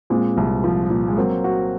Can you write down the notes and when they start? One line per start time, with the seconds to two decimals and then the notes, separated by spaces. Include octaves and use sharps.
0.10 A#2 G#3 C4
0.37 C2
0.64 F3
0.90 A#2
1.08 G#3
1.17 F#3 A#3 C4
1.44 F#4